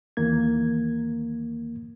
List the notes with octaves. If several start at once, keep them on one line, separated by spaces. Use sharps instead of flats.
D#2 D#3 E3 A#3 G#6